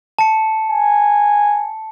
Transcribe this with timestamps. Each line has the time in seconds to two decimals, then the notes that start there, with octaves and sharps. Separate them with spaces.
0.19 A5 C#7
0.71 G#5